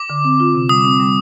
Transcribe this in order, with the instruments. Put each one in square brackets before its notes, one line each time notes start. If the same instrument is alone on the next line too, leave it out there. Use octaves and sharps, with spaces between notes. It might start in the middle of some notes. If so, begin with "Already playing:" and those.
Already playing: [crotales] D6
[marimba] D3
C4
F4
C3
[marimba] G3 [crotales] D#6
[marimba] C4
G3